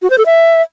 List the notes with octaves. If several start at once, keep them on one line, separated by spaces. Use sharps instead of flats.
F#4
C5
A4
E5